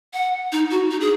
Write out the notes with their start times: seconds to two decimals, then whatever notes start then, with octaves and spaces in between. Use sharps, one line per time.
0.14 F#5
0.52 D#4
0.71 F#4
0.91 D#4
1.01 G#4